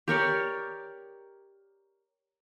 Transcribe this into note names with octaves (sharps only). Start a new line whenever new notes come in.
G4 A#4 C#5 D5